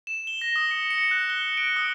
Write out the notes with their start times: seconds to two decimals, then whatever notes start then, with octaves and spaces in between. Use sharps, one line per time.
0.07 E7
0.27 G7
0.41 A#6
0.56 D#6
0.71 C#7
0.90 C#7
1.11 F#6
1.30 G7
1.57 D7
1.76 D#6